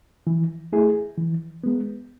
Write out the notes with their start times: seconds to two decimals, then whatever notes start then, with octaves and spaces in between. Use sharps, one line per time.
0.27 E3
0.72 A3 E4 G#4
1.17 E3
1.64 G#3 B3